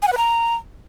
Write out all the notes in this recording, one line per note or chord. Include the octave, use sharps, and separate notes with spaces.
G#5
F#5
B4
A#5